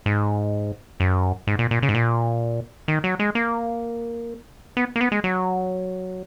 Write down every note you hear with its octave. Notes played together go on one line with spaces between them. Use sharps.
G#2
F#2
G#2
A#2
A#2
C#3
G#2
A#2
D#3
F#3
G#3
A#3
B3
A#3
B3
G#3
F#3